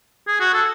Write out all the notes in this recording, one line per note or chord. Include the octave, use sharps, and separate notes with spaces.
G#4
F#4
A4